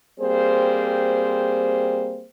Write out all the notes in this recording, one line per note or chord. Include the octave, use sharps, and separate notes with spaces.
G3 A#3 C4 G#4 C5